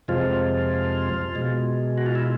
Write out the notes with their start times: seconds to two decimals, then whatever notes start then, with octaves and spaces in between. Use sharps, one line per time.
0.08 F2 C3 F3 G#3 F4
1.35 B2 G#3
1.98 F#4
2.06 F4
2.15 E4